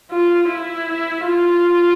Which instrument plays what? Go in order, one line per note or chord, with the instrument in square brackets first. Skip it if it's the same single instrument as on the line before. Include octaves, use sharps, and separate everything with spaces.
[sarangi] F4
E4
F4